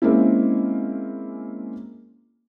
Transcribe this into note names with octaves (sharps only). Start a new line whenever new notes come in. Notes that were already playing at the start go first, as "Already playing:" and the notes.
G#3 A#3 C4 C#4 E4